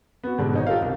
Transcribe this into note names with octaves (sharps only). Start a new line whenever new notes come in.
B3 F#4
G#2 B2 D3 G3 D4
G#1 D#4 C#5
F4 G4 A4 A#4 D#5 F5
C2